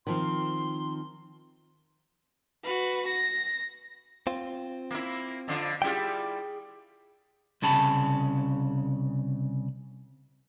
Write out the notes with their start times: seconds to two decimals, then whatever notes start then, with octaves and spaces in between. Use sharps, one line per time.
0.07 D#3 F3 C4 C6
2.64 F#4 B4
3.07 A#6
4.27 C4 F4
4.91 A#3 E4
5.48 F2 D3 F3
5.82 G3 E4 F4 G#4 G5
7.62 C2 C#3 C#4 A5 B5